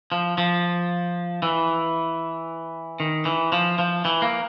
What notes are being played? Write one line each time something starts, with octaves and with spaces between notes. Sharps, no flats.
F3
F3
E3
D#3
E3
F3
F3
E3
A#3